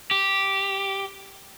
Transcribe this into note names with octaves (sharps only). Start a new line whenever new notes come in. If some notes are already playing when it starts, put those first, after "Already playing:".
G4